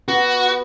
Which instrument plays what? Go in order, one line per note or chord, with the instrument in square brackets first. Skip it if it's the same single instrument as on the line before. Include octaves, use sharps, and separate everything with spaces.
[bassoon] B3 [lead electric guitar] F#4